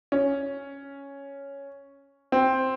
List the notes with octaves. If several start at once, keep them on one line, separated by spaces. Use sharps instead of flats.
C#4
C4